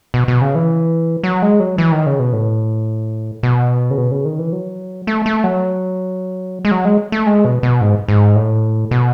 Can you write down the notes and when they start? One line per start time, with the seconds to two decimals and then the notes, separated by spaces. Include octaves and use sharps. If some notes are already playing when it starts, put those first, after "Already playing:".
0.14 B2
0.28 B2
0.42 C#3
0.55 E3
1.23 F#3
1.42 G#3
1.60 F#3
1.78 E3
1.92 D#3
2.06 C#3
2.19 B2
2.33 A2
3.43 B2
3.91 C#3
3.98 B2
4.11 C#3
4.25 D#3
4.39 E3
4.52 F#3
5.07 A3
5.26 A3
5.44 F#3
6.65 G#3
6.71 F#3
6.85 G#3
7.12 A3
7.27 G#3
7.45 B2
7.63 B2
7.81 G#2
8.08 G#2
8.36 A2
8.91 B2